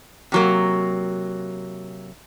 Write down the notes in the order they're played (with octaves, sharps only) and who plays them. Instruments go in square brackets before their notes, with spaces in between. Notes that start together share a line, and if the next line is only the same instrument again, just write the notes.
[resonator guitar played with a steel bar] C3 F#3 A#3